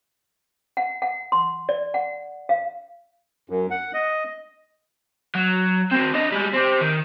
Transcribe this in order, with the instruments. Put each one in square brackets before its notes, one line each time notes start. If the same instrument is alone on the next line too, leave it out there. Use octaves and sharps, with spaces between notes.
[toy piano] F#5
F#5
C6
D5
F#5
F5
[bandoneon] F#2
F#5
D#5
[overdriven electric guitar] F#3
C4 F#4
D4 D#5
G3 G#3
C4 G4
D#3